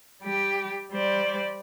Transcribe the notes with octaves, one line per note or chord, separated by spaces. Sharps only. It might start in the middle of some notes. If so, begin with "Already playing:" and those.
G3 G4
G3 C5 D5